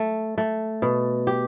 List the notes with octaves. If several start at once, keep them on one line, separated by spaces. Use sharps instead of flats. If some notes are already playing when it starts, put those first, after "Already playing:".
Already playing: A3
A3
B2
G4